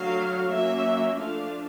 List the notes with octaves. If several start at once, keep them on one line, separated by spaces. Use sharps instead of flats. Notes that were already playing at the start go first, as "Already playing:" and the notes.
Already playing: D3 F#3 A3 F5
F#3 A#3 C#4 E5
F3 A3 D4 F5